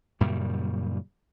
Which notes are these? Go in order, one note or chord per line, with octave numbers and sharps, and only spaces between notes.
F#2 A#2 C#3 G3